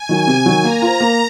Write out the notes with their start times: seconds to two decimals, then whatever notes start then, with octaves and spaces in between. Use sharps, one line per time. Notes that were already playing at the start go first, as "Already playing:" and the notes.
Already playing: G#5
0.09 D#3 F#3
0.27 C3
0.46 D#3 F#3
0.64 A#3 A#5
0.82 F4 C5
1.00 A#3